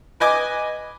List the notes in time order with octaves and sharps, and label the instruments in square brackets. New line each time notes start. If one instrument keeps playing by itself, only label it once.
[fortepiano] B4 D#5 G#5 D6